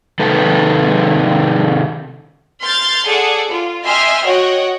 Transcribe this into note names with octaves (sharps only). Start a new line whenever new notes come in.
C3 D#3 A4 B4
C6 F6 G6 A6
G#4 A4 D5 F#5
F4
D#5 E5 G5 G#5 C6 F6
F#4 C#5 D#5 F#5 G5